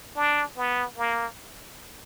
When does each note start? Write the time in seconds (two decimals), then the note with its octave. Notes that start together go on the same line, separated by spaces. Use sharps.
0.16 D4
0.57 B3
0.98 A#3